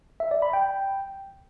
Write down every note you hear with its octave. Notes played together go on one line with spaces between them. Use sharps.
E5
D5
B5
G5